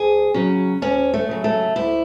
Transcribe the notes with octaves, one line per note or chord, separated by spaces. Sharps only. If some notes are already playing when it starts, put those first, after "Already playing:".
Already playing: D2 G#4
C#3 F#3 C#4
D2 C#4
A3
C#3 F#3
A3
D2 E4